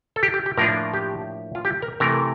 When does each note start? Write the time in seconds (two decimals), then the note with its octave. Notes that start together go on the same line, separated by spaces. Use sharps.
0.16 A4
0.23 G4
0.34 G4
0.46 G4
0.57 A2 F3 A#3 D4 F4 A#4
0.94 G4
1.55 F4
1.65 G4
1.82 A#4
2.00 C3 E3 A3 A#4